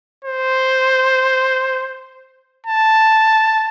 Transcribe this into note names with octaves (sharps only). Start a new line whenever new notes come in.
C5
A5